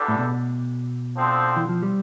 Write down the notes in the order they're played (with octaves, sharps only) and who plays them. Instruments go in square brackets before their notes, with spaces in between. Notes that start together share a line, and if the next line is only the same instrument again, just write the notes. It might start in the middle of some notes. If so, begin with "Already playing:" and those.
Already playing: [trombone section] E2 D3 G3 D4 A4
[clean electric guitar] A2
B2
[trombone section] D3 F3 C4
[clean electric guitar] E3
F3
G3